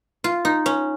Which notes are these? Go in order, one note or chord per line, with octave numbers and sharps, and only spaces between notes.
F4
D#4
C#4